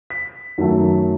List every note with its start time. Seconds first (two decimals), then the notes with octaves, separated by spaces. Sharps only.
0.10 B6
0.58 F#2 D#3 F#3 A3